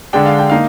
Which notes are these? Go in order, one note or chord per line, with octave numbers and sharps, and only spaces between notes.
D3 G#3 D4 G5
F5
G5
A#3 D#4 F5